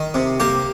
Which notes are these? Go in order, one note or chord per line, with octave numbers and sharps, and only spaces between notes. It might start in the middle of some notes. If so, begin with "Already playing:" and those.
Already playing: D#3
C3
A#3 G4